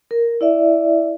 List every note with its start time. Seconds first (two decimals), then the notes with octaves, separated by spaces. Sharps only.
0.11 A#4
0.41 E4 D5 E5